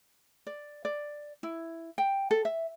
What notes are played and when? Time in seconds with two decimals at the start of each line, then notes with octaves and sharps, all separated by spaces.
0.47 D5
0.85 D5
1.43 E4
1.98 G5
2.31 A4
2.45 E5